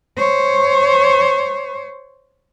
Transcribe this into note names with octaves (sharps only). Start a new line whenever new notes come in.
C5 C#5